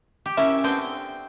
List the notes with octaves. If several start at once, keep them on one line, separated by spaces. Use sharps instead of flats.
G4
C#4 E4 A#4 E5
D3 B3 C4 G5